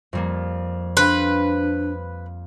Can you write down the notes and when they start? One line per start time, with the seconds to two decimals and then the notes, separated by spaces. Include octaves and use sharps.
0.13 F2 G3 A#3
0.97 D4 B4 C5 F5 G5